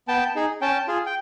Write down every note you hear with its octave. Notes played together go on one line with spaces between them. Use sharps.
B3 G5 A5
D#4 G#4
C#4 G5 A5
F4 G#4
G5